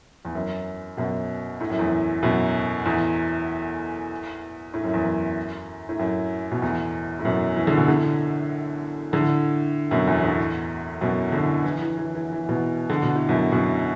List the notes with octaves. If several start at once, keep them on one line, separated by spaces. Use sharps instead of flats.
E2
F#2
F#2 B2
A2
F#2
E2 A2
F#2 B2
E2 A2
A2
F#2
E2
F#2
A2
F#2
B2
E2 A2
A2
F#2 B2
E3
D3
B2
A2 D3
A2 D3
F#2 B2
E2 A2
E2 A2
F#2 B2
A2 D3
E3
E3
E3
E3
E3
B2 E3
D3
B2
A2
F#2 B2
F#2 B2